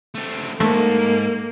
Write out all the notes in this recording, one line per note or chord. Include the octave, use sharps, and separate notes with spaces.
A3 C4
G#2 A3 A#3